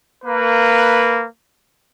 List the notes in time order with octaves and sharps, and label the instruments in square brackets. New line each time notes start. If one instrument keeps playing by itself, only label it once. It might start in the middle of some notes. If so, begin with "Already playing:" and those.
[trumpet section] A#3 B4